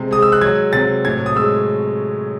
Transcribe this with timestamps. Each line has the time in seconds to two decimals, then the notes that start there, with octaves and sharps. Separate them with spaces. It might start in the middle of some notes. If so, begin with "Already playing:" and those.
Already playing: C3 G#3
0.11 G#3 D#6
0.22 E6
0.32 F#6
0.41 F#3 G#6
0.73 C3 A6
1.05 A2 G#6
1.26 D#6
1.36 G#3 E6